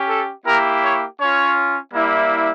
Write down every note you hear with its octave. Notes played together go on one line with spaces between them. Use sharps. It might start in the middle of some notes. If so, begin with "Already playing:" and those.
Already playing: C#4 G4
A4
A#3 E4 G4 A#4
C#5
C#4 F4 C#5
G3 A#3 E4